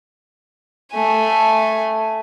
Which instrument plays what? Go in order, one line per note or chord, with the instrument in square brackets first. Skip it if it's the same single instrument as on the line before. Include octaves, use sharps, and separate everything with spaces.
[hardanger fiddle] A3 G#5